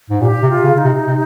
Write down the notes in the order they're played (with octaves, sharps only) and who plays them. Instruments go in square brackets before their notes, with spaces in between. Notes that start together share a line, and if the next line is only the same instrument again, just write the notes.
[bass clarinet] G#2
[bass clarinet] A#2 [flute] G4
[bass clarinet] C3
[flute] F4
[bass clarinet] C#3
[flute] D#4
[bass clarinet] C3
C3